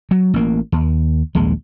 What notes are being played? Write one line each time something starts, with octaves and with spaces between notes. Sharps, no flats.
F#3
A1 A#3
D#2
A#1 D#2 G#3